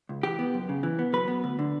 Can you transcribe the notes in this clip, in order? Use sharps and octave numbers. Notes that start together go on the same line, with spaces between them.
C#2
E3 G4
B3
F#2
C#3
E3
B3
F#3 B4
B3
D2
D3